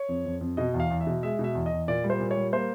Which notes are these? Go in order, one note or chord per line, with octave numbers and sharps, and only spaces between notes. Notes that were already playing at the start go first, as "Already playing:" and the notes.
Already playing: C#5
F2
F2
F2
B2 D#5
E2
F5
E2
E5
B2
G#3 E5
B2
E5
E2
E2 D#5
A#2 D5
G3
C5
A#2
C#5
G3
A#3 C5